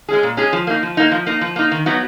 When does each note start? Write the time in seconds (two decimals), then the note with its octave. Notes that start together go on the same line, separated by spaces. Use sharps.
0.08 G#3 C#4 G#4
0.23 A#2
0.37 G#3 C#4 G#4
0.53 F3
0.67 A#3 D#4
0.83 F3
0.97 A#3 D#4
1.12 F3
1.26 A#3 D#4
1.41 F3
1.56 A#3 D#4
1.71 D#3
1.86 F#3 B3 D#4 F#4